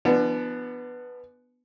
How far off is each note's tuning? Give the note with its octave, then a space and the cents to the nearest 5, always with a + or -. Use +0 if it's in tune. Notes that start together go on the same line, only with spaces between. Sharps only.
F3 -40 B3 +0 D4 +20